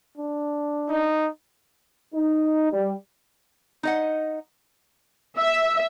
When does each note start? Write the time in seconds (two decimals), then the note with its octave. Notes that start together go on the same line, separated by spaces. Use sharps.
0.18 D4
0.90 D#4
2.15 D#4
2.72 G3
3.83 D#4 D#5 F#5
5.37 E5